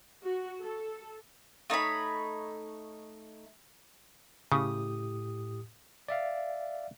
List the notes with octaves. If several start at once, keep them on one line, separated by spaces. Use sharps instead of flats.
F#4
A4
A3 D#4 C#5 B5
A2 C#3 G4 D#6
D5 E5 F5